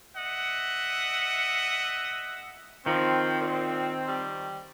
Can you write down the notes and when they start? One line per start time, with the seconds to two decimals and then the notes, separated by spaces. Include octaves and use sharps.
0.16 D#5 E5 F#5
2.86 D#3 F3 C4
3.42 A#2
4.08 G3